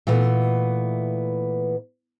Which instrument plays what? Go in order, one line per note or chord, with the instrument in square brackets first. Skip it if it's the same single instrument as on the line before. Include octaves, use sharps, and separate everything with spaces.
[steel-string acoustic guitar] A#2 E3 A3 B3